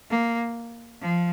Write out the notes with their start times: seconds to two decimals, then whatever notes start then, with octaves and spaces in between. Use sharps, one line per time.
0.10 A#3
1.02 F3